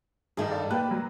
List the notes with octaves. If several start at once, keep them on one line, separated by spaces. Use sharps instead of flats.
G2 D#3 G3 D#4 G#4
A4 D5 F5
A#3 G4 B4 F#6
F#3